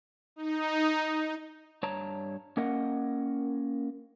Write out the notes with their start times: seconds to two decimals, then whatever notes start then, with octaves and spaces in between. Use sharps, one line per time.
0.36 D#4
1.83 G2 C#5 A5 A#5
2.57 A#3 C#4 A#4 D#5 F#5